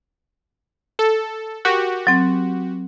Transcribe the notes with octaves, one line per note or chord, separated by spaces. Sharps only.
A4
F#4 G4 A#4
F#3 C4